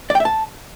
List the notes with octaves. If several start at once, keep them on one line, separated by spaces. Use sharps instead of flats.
D5
G5
E5
A5